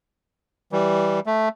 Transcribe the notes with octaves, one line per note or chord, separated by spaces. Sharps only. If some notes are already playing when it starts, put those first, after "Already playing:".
E3 G3
A3